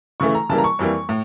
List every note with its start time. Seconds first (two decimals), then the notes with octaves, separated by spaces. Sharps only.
0.20 C#3 E3 A3 C#6
0.35 A#5
0.49 C#3 E3 G3 A#3 A5
0.58 A#5
0.64 C#6
0.79 F2 E3 G3 A#3
1.09 A2